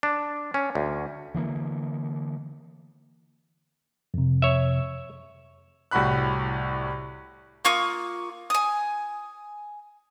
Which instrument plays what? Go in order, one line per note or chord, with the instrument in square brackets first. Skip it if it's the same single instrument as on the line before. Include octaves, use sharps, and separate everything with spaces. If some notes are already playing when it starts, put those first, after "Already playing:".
[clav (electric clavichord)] D4
C#4
D2
[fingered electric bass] D3 E3 G3 A#3
[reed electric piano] F2 C3
[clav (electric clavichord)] C#5 E5
[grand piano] C2 A2 F#4 B5 F#6
[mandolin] A#3 F4 C#6 D#6
G#5 D#6